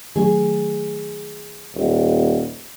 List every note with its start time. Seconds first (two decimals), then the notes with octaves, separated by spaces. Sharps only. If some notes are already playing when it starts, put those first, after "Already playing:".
0.16 D#3 F#3 A3 G#4
1.75 D#1